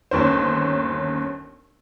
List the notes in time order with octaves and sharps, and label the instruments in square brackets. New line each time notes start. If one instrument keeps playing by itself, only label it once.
[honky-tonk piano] G1 D#2 C#4 C5